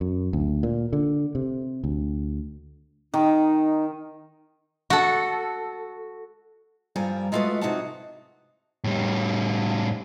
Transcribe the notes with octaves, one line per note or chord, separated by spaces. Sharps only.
F#2
D2
A#2
D3
C3
D2
D#3 D#4
F#4 A4
G2 F3 G3 A#4 G#5
G#3 A3 F4 F#4 B4 D#5
C3 D#4 F#4 G#4 F#5 A5
A2 G3